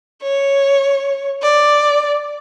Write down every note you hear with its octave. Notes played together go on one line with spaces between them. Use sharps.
C#5
D5